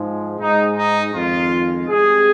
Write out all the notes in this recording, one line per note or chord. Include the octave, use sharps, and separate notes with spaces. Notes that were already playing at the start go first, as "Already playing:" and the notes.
Already playing: G#2 F3 G#3
G#2 G#3 D#4
D#4
F2 D#3 G#3 F4
C2 C3 G#3 G#4